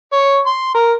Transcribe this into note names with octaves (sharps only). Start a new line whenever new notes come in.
C#5
C6
A#4